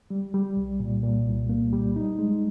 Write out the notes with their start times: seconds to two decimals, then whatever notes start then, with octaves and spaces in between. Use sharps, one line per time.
0.10 G3
0.34 G3
0.57 C2
0.80 A#2
1.03 A#2
1.26 C2
1.49 A#3
1.73 G3
1.96 D#4
2.19 G#3